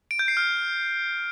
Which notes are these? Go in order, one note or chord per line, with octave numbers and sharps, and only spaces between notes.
D7
G6
C7
F6